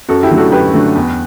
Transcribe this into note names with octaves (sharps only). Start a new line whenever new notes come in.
F#2 F#4 A4
E4 G4
D3 F#3 A3
F#4 A4
F#2 G4 B4
D3 F#3 A3
E2